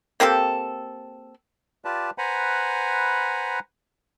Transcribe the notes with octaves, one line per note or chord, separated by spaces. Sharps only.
A#3 C4 G4 A4
F4 G4 B4 D5 A5
B4 C5 F#5 G#5 A#5 B5